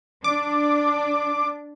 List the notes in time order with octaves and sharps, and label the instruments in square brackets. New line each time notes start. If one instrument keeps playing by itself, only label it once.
[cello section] D4 [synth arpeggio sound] D6